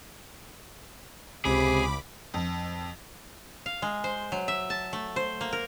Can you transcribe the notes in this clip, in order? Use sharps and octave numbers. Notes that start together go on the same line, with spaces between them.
C#2 C3 G#4 B5 D6
F2
F5
G#3
C5
F#3
E5
A5
A3
C5
A#3
A#4